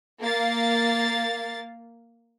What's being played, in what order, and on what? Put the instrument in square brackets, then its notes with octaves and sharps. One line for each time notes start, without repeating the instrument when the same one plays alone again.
[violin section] A#3 F5 A6